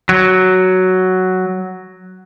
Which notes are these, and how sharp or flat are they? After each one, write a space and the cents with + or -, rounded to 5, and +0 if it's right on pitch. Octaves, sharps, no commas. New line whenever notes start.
F#3 +5